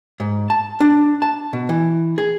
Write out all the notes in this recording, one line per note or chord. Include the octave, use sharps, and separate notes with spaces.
G#2
A5
D4
A5
B2
E3
G#4